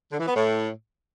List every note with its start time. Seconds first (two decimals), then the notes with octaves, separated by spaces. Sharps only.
0.12 D3
0.20 E3
0.27 B3
0.35 A2